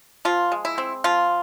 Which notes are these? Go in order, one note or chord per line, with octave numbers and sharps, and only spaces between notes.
F3 F4
G#3
E4
C4
F3 F4